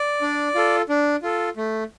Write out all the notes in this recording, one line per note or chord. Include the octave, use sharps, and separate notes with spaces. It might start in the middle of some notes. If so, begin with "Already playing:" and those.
Already playing: D5
D4
F4 A4
D4
F4 A4
A3